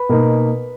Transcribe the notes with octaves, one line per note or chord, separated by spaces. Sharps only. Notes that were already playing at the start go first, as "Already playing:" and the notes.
Already playing: B4 B5
B2 A#3 D#4